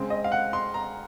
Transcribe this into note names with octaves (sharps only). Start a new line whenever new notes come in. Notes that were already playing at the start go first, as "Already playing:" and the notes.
Already playing: C#3 G#3 C4
D#5
F5
F#5
C6
A#5